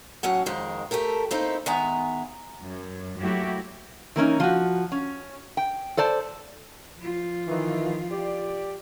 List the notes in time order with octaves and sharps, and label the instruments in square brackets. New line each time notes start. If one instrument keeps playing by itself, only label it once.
[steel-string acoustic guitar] A2 F#3 C#4 F#5
F2 D#3 G#3 A#4
A3 G4 A4 A#4
A#3 C4 D#4 E4
D#3 G#3 B3 E5 G#5 A#5
[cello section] F#2
F#3 A3 A#3 E4 F#4 G4
[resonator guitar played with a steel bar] E3 A#3 C#4 D#4
F3 F#4
C#4
G5
A4 C5 D5 A5
[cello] F3 F4
[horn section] D#3 E3
G4 D5